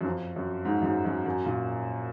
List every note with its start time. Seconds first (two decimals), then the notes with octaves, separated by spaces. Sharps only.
0.01 F#2
0.05 F2
0.36 F#2
0.65 G#2
0.82 F#2
0.85 G#2
1.05 F#2
1.26 F#2
1.45 A#2